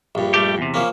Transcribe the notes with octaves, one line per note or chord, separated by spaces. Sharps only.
A#1 G2
G3 A3 G4
E2 C3
F3 A#3 C#4